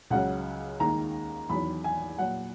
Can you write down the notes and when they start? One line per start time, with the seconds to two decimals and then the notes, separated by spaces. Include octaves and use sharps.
0.10 C#2 C#3 F#3 F#5
0.80 D#2 D#3 G#3 A#5
1.49 E2 D#3 F#3 B5
1.84 G#5
2.18 A#2 F#3 F#5